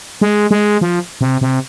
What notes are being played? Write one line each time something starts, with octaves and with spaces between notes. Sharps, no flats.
G#3
G#3
F3
C3
C3